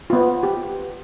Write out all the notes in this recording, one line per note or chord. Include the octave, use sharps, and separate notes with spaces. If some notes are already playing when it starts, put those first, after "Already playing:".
B3 F4
G4